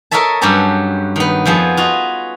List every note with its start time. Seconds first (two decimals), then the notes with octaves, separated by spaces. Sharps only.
0.11 A4 A#4 C#5 D#5 E5 A5
0.41 G2 F#3 C#4 G4 C#5 A5
1.16 D#3 B3
1.46 F2 F3 B3 G#4
1.77 F4 F#4 D#5